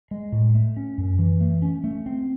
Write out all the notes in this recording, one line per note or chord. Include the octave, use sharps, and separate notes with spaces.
G#3
A2
A3
C#4
F#2
E3
A3
C#4
A3
C4